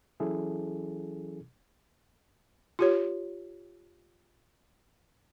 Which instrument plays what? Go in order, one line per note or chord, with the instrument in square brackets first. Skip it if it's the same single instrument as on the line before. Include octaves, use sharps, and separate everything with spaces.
[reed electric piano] E3 F#3 C#4 E4 G#4 A4
[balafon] F4 G4 C#5